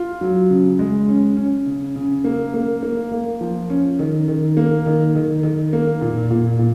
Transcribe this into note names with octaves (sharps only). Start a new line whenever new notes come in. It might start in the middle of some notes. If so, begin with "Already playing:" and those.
Already playing: F4
F#3
C#3
G#3
C#4
C#4
C#3
C#3
A#3
A#3
A#3
A#3
F3
C#4
D#3
D#3
A#3
D#3
D#3
D#3
A#3
A#2
A#2
A#2